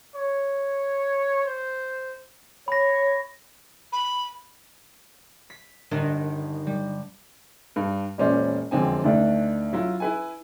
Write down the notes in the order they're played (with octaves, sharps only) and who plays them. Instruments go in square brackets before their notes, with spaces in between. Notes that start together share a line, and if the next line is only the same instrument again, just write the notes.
[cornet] C#5
C5
[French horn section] C#5 [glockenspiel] B5 A#6
[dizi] B5
[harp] B6
[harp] G1 [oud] D#3 D4 D#4
[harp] G3
[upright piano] G2
E1 A#2 C#4 C5 D5
E1 F2 D3 C4 G#5
D2 D#3 D4
F#3 E4 F4
E4 B4 G#5